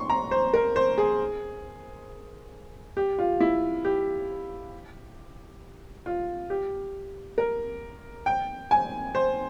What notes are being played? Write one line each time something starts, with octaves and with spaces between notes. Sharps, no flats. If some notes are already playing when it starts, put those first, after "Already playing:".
Already playing: C6 C#6
A#5
C5
A#4
C5
G#4
G4
F4
E4
G4
F4
G4
A#4
G5
G#5
C5